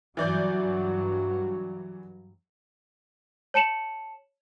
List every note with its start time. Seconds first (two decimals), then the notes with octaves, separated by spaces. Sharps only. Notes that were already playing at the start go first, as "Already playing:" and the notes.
0.17 G2 E3 F#3 D5 G6
3.54 C#5 A5 C#7 E7 F#7